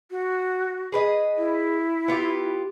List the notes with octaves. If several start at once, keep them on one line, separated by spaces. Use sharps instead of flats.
F#4
G#4 B4 D#5
E4
B3 F4 G4